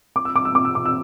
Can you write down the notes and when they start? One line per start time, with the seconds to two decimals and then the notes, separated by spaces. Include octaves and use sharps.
0.16 D6
0.25 E6
0.36 D6
0.45 E6
0.55 D6
0.65 E6
0.75 D6
0.85 E6